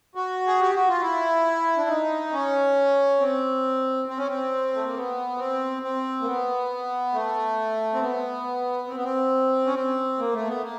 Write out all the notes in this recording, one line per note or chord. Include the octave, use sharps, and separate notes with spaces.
F#4
G#4
G4
F#4
F4
E4
D4
D#4
C#4
C4
C4
C#4
C4
A3
A#3
B3
C4
C4
A#3
B3
A3
C4
B3
C4
B3
C4
C#4
C4
A#3
A3
B3
A#3